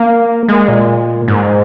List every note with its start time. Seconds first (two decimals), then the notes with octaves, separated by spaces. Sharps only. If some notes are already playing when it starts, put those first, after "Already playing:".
Already playing: A#3
0.48 G#3
0.68 A#2
1.28 G#2